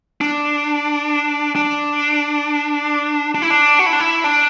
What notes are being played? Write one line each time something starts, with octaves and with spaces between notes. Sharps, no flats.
D4
D4
D4
E4
D4
F#4
E4
D4
E4
D4